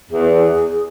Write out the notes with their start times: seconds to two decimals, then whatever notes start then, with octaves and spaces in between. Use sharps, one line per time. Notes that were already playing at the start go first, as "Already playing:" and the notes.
0.11 E2 G#4